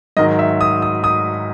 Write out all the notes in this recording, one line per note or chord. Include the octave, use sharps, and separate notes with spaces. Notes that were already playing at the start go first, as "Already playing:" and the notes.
G#2 D#3 F#3 D#5
E5
D#6
D#6
D#6